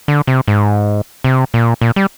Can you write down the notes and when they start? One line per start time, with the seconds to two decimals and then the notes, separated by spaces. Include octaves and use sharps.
0.08 D3
0.27 C3
0.48 G#2
1.24 C3
1.54 A#2
1.81 A#2
1.96 G3